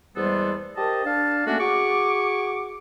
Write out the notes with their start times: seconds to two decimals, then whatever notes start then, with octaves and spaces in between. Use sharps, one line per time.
0.16 E2 G3 G#3 B3 A4 C5
0.77 G4 A#4 C5 D#5 A5
1.04 D4 F5 A5
1.46 A3 A#3 C#4 D4 F#4 A4
1.59 F#4 G#4 C#6 D6